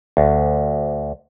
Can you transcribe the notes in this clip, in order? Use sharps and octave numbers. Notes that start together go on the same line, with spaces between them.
D2